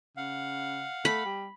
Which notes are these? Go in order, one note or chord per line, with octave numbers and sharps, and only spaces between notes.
C#3 F5 F#5
A3 B5
G3